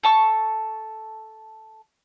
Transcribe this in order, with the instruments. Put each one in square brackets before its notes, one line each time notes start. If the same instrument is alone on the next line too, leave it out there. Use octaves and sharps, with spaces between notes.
[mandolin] A4 A5 C#6